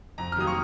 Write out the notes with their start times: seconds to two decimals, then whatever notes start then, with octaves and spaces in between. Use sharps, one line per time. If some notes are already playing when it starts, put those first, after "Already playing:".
0.18 F2 A#5
0.32 F6
0.36 D#3 F#3 A#3 D#6
0.47 C#6